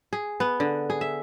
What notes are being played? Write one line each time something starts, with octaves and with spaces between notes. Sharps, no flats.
G#4
B3
D3
G#4
E5